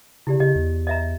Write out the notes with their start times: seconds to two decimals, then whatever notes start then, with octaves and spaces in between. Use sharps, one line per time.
0.27 C#3 E4 G4 D5
0.40 C#3 G4 D#5
0.55 E2
0.87 D#5 E5 A#5